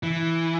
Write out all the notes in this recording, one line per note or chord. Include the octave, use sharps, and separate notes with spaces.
E3